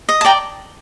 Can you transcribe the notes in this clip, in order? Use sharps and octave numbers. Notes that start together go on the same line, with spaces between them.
D#5
A5
D5 G5 A#5